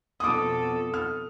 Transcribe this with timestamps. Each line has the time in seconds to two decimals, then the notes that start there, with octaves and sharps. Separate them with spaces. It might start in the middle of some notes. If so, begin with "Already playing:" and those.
0.20 F2 B2 A4 D6 D#6
0.94 F6